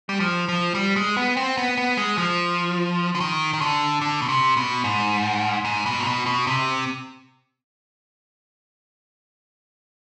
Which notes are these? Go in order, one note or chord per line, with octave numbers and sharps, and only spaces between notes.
G3
F3
F3
G3
G#3
B3
C4
B3
B3
G#3
F3
D3
D#3
D#3
D3
D3
B2
C3
B2
G#2
G#2
B2
G#2
B2
B2
C3